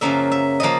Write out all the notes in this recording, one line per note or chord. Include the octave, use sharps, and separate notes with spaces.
F#2 C#3 F3 A#3 E5
E5
C#3 F3 A#3 D#5